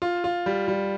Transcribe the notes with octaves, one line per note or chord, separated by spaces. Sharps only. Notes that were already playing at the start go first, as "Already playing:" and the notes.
F4
F4
G3
G3